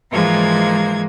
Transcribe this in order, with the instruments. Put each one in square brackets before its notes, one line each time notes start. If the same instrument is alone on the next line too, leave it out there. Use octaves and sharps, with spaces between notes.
[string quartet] G#2 E3 F3 G#3 A#3 G#6